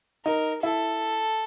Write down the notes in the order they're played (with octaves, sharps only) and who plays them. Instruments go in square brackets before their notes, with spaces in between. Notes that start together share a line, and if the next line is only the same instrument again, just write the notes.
[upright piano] D#4 [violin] A#4
[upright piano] E4 [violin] A4